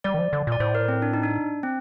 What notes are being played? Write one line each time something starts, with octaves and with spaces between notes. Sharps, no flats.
G3 D5
D#3
F3
D3
A#2
D5
A2 C5
A#4
C4
D4
D#4
D4
C4